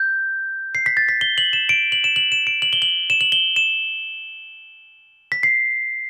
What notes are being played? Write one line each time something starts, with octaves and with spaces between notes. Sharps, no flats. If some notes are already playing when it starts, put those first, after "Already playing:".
Already playing: G6
C7
B6
A6
B6
G7
F#7
E7
D7
F#7
E7
F#7
E7
D7
F#7
G7
F#7
E7
F#7
G7
E7
B6
C7